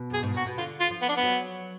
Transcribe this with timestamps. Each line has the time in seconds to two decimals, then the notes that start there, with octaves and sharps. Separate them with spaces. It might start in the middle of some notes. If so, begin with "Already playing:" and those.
Already playing: B2
0.10 F#2 G#4
0.23 G#2
0.34 A#2 F#4
0.46 B2
0.58 D3 F4
0.80 F4
0.91 F3
1.02 B3
1.09 D4
1.16 B3
1.23 F#3